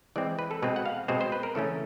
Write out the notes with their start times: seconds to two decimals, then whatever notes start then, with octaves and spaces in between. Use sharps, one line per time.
0.16 E3 G#3 C4 D5
0.39 B4
0.51 A4
0.62 B2 G#3 C4 B4
0.76 F#5
0.86 F5
1.08 B2 G#3 C4 C5
1.21 C5
1.32 B4
1.43 A#4
1.55 C#3 E3 A3 C#4 A4